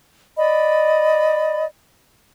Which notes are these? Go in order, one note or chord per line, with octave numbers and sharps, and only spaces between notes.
D5 D#5 B5